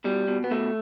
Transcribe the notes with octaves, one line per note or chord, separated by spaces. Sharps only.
B2 G3
B2
B3
B2 A3